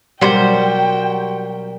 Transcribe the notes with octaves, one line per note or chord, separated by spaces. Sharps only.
B2 F#3 G3 F#4 A#4 C5 G5